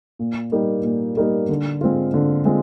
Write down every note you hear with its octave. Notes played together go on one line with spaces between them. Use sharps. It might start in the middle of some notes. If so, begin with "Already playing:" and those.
A#2
G3 A#3 D#4 G4
A#2
G3 A#3 D#4 G4
D3
G#3 C4 F4
D3
G#3 C4 F4